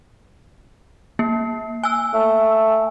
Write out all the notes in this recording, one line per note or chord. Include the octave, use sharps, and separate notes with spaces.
A#3
G#5 E6
A3